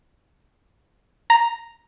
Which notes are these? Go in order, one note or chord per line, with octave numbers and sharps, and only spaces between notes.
A#5